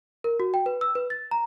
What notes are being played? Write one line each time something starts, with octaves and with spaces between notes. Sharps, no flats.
A#4
F#4
G5
B4
E6
B4
A6
A#5